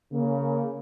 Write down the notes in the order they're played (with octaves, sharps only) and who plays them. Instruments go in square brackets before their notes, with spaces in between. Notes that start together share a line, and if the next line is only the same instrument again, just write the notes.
[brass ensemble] C#3 A#3